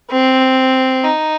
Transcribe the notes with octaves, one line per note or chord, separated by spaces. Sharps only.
C4
D#4